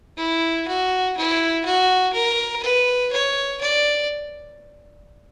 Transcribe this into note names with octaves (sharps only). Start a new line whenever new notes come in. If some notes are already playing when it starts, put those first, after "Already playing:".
E4
F#4
E4
F#4
A#4
B4
C#5
D5